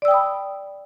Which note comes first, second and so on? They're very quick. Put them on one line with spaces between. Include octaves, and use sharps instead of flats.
D5 E6 G5 D#6 B5